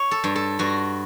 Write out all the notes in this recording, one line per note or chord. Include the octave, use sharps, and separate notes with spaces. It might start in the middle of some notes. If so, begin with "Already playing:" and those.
Already playing: C#5
A4
G2
A4
G2 F#4